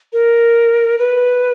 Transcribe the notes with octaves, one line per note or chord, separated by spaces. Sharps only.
A#4
B4